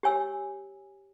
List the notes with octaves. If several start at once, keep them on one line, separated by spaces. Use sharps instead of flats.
G4 C#5 G#5 E6